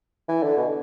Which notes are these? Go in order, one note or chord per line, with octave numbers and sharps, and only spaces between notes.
E3
D3
B2